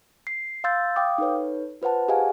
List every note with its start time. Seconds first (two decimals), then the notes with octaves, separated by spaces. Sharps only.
0.27 C7
0.64 F5 C6 E6 G6 A6
0.96 F5 G5 D6 D#6
1.18 D#4 A4 B4 C#5
1.82 F4 B4 C5 F#5 A5
2.08 G4 G#4 D#5 F5 F#5 G#5